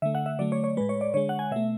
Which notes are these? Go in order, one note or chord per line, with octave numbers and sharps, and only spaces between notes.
D3 A3 E5
F#5
E5
D3 F#3 A3 D5
C#5
C#5
A2 G#3 B4
C#5
D5
D3 G#3 C#5
F#5
G#5
B2 A3 E5